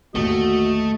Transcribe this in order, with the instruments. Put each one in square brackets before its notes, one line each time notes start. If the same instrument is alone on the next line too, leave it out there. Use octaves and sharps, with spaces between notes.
[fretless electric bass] G1 D#2 A#2 [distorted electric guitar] A3 [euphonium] F#4 [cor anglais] D#5